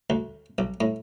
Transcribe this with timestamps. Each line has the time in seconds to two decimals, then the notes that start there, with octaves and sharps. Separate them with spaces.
0.10 D2
0.58 B1
0.81 A2